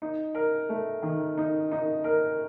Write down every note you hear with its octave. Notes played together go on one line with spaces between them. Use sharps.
D#4
A#4
A3
D#3
D#4
D#4
A#4